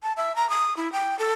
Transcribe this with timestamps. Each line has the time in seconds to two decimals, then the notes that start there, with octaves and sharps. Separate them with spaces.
0.03 A5
0.17 E5
0.36 A#5
0.50 D#6
0.77 E4
0.92 G5
1.19 A4